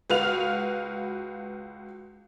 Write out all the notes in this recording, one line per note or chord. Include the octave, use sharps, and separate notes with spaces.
C#2 F#4 B4 F5 F6 F7